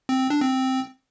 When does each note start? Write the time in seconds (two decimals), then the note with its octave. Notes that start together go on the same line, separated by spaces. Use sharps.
0.09 C4
0.20 C4
0.30 D4
0.41 C4